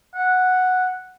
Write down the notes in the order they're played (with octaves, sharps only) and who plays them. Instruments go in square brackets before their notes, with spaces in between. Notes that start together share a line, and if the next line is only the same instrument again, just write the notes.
[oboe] F#5